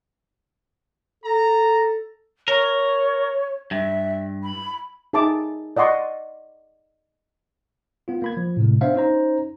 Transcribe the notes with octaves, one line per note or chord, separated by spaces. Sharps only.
A4 A#5
A#4 C#5
G2 E5
B5
D#4 G#4 E5 A5 B5 D6
D5 D#5 F#5 C6 C#6
B3 F4
A#3 B5 G#6
F3
A2 C3 G#3
B3 D4 C5 E5 F5
C#4 D#4 C5 A#5